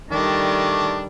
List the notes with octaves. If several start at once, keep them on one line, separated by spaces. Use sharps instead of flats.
D#3 G3 A3 D4